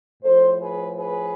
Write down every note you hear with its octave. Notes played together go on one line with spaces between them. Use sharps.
A2 F3 A4 C5
G#4 B4
G#4 B4